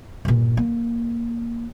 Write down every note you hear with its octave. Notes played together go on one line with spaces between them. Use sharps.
G2 A#2
A#3